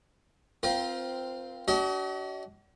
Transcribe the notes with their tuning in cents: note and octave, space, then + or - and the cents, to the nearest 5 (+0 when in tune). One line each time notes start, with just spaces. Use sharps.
C4 -10 F4 +0 A#4 +35
D4 -35 F#4 +40 D#5 +40